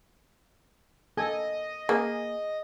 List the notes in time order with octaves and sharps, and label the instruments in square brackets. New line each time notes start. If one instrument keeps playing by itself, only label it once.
[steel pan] A#3 A4 G#5 [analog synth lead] D#5
[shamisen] A#3 [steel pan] G#4